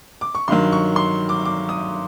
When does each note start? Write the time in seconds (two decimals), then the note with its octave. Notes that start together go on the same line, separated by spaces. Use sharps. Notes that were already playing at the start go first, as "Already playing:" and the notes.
0.21 D6
0.35 C#6
0.48 G2 D#3 F#3 C6
0.72 C#6
0.96 C6
1.29 D6
1.45 D6
1.69 D#6